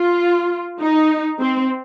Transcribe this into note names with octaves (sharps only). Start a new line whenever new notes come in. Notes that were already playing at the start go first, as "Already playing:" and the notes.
Already playing: F4
D#4
C4